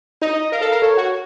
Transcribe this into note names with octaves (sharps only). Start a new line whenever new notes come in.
D#4 D#5
A#4 F5
A4
A#4
A4 C#5
F#4